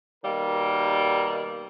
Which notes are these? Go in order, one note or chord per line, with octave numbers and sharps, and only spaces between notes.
B2 D#3 G3 A#3 A#4